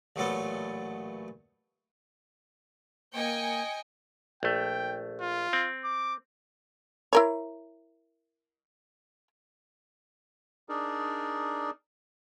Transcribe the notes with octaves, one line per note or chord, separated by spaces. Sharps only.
A1 A#2 F#3 A3 B3 A4
A#3 D#5 G5 G#5 C#7
A#1 A3 G5
F4
C4
D6
E4 A#4 C#5
D4 D#4 G#4 A#4 D5